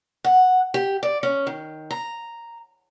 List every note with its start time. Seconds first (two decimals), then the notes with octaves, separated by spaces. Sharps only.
0.24 F#5
0.74 G4
1.03 D5
1.23 C#4
1.47 D#3
1.91 A#5